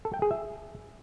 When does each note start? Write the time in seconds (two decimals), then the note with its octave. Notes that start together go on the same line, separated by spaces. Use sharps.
0.05 A4
0.14 G5
0.22 G#4
0.31 E5